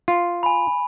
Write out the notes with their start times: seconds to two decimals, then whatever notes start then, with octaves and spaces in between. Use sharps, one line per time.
0.08 F4
0.43 G#5 B5